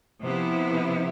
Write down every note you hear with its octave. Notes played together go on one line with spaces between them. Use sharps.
C3 F3 B3 E4